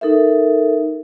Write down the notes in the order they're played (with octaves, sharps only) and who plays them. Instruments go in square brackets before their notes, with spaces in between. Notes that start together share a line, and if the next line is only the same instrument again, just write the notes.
[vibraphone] D#4 A4 A#4 E5